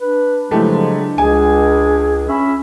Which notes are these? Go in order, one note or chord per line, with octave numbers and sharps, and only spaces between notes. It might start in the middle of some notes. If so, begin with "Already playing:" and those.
D4 B4
C#3 F3 F#3 G#3 A3 E4 G4
C#2 G#4 G#5
C#4 E5 B5